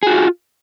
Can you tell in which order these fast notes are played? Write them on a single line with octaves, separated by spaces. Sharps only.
G#4 F#4 F4